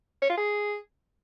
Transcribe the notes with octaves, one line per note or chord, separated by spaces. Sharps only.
C#5
F4
G#4